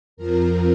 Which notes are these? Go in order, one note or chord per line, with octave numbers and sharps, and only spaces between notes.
F2 F3 A#4